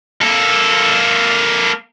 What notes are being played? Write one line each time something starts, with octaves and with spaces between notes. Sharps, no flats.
A#3 A4